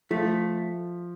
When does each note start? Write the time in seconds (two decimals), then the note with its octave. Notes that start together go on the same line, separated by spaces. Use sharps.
0.11 F3 A3